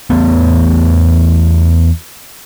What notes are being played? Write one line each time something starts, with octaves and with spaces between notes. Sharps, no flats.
E2 A3 B3